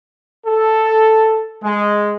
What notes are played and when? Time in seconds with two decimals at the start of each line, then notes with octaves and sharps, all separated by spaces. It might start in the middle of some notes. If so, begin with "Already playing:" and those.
0.45 A4
1.62 G#3